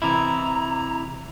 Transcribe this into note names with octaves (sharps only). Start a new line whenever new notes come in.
C3 E3 E4 A#5